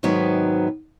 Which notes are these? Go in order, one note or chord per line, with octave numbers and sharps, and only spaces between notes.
G#2 C3 D#3 F#3 B3